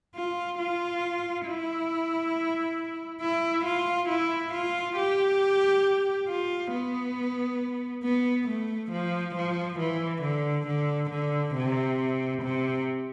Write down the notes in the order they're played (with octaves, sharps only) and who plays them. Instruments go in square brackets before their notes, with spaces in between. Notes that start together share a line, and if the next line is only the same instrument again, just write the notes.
[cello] F4
F4
E4
E4
F4
E4
F4
G4
F4
B3
B3
A3
F3
F3
E3
D3
D3
D3
C3
C3